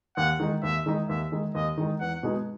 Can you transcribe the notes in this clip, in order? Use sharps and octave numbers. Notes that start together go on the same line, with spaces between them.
D#2 F#5
D#3 G#3 D#4
D#2 E5
D#3 G#3 D#4
D#2 E5
D#3 G#3 D#4
D#2 D#5
D#3 G#3 D#4
E2 F#5
B2 G#3 D#4